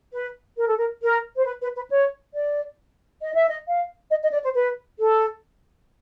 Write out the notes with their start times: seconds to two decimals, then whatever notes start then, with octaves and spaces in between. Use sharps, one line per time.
0.13 B4
0.57 A#4
0.67 A4
0.77 A#4
1.02 A#4
1.37 C5
1.45 B4
1.61 B4
1.76 B4
1.90 C#5
2.34 D5
3.22 D#5
3.35 E5
3.49 D#5
3.67 F5
4.10 D#5
4.22 D#5
4.33 D5
4.44 C5
4.54 B4
4.99 A4